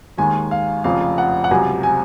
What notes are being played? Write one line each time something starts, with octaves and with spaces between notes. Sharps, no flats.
D#2 D#3 G#3 G#5
F5
F1 F2 C#3 F3 F5
F#5
F#5
C#2 C3 F#3 G#5
G#5